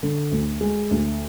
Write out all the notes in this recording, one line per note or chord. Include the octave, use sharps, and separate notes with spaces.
D3
D2
G#3
D2